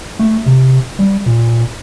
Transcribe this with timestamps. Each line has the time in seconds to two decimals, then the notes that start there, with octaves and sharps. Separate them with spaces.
0.19 A3
0.46 C3
0.99 G3
1.26 A#2